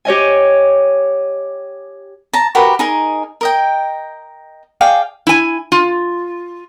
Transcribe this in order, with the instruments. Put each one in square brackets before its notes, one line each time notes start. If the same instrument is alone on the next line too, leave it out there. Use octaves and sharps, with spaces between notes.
[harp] G4 C#5 D#5 G#5
[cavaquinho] A5 A#5
F#4 G4 A#4 B4
D#4 G#4 A#4
A#4 D#5 G5
G#4 D5 F5 G5
[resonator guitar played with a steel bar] E4 G#5
F4